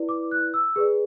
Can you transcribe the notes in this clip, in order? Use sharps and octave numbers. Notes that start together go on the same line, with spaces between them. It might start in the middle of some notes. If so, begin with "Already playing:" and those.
Already playing: E4 B4 D5
D6
F#6
E6
G#4 B4 D5